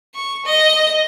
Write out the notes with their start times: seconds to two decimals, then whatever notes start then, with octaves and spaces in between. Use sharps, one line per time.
0.15 C#6
0.45 D#5